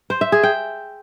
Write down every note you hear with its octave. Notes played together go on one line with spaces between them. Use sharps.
C5
E5
G#4
G5